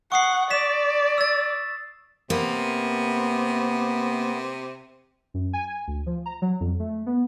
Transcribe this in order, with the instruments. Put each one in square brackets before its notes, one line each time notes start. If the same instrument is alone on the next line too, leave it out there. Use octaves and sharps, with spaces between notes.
[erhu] F#5 [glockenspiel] C#6 D#6 C7
[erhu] D5 [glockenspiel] B6 E7
[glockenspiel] E6 A6
[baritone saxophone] C3 [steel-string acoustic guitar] A#3 [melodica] B3
[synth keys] F#2
G#5
D2
F3
A#5
F#3
F2
A3
B3